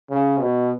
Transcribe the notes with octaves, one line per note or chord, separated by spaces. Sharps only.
C#3
B2